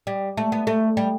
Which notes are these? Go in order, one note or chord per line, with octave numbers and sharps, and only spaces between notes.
G3
A3
B3
A3
G3